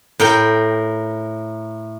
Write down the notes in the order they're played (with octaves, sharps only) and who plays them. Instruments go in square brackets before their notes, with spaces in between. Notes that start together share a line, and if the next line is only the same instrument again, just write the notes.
[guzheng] A2 A#4 G5